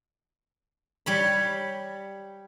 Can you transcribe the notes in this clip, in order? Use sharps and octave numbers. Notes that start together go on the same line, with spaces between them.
G3 C#5 B5